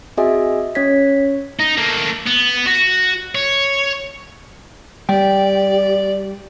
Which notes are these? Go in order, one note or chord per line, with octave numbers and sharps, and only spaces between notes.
C4 F#4 G#4 D#5 E5 G#5
C#4 C#5 G#6 B6
D#4
A3 A#3
B3
F#4
C#5
G3 G4 D5 G5